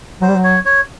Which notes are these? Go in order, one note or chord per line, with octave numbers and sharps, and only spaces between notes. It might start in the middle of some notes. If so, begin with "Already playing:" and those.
F#3 C5
G3
F#3
C#5
C#5